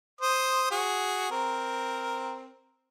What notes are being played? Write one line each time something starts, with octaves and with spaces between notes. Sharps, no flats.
C5 D#6
F#4 G#4
C4 A#4